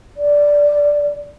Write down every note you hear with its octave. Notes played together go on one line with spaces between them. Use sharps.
D5